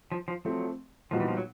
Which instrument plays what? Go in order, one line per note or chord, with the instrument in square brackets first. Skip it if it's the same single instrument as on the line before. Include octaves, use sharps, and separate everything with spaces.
[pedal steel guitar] F3
F3
[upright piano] F3 A3 C4 [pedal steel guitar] F#3
[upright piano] A#2 G3 B3 D#4 F#4 [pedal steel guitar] F3
[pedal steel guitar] E3
F3
F#3